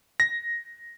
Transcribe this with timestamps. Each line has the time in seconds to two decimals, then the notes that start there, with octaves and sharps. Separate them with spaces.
0.20 A#6